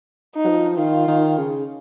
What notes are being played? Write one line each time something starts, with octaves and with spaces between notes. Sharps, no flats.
D#4
F#3
F3
D#3 F4
D#3
C#3